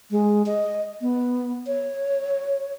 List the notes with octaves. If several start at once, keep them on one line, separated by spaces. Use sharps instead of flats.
G#3
D#5
B3
C#5